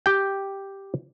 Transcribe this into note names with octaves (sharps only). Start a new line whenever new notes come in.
G4 G5